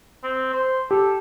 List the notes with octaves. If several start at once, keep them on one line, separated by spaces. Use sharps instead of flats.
C4
C5
G4 A4